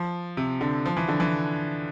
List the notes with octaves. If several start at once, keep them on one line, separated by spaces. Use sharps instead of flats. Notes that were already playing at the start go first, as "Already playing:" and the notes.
Already playing: F3
C3
D3
F3
E3
D3
E3